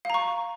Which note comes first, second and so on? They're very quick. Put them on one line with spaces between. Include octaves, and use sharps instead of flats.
F5 A#5 C#6